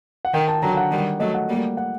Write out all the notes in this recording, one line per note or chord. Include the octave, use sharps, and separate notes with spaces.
F#5
D#3 G5
A5
D3 F#3 A#5
F#5
D#3 G3
F#3 A3 D#5
F#5
G3 A#3
F#5